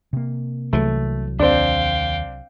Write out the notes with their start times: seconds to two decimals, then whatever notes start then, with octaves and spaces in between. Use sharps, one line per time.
0.13 C3 A#3
0.73 C2 E3 F#3 A3
1.39 D#2 C4 D4 F5 G5